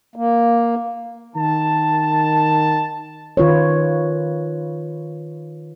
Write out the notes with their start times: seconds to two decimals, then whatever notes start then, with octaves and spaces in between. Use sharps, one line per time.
0.16 A#3
1.35 D#3 A5
3.37 D#3 F4 B4 C#5